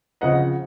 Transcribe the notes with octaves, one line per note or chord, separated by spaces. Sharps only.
C#3 F3 C4 D#5 F#5